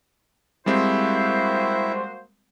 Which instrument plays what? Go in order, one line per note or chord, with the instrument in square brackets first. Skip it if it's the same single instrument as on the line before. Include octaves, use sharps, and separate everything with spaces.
[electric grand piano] G3 G#3 C4 [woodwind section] A#3 F#4 C5 [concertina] E4